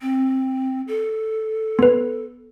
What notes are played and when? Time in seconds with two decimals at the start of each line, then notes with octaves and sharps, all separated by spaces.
0.01 C4
0.88 A4
1.79 B3 B4